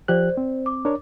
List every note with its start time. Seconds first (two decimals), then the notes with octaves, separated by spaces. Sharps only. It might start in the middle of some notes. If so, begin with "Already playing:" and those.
0.08 F3 G4 C5 D5 F#6
0.37 C4
0.66 D6
0.85 D4 A#4 C#5